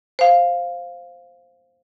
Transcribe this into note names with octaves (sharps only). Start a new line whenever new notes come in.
C5 F5